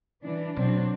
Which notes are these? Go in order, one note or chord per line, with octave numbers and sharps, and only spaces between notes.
E3 D4
B2 F#3 C4 D4